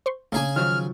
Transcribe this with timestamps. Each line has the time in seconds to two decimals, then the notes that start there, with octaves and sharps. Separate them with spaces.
0.06 C5 C6 C#6
0.32 C#3 A3 A#3 D4 G#4 G#5
0.56 D#3 F3 F#3 F6